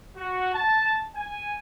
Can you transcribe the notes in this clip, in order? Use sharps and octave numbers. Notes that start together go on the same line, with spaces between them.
F#4
A5
G#5